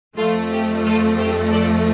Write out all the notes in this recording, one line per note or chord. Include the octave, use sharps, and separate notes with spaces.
F2 F3 A3 F4
G4
F4 A4
G4 C5
A4 D5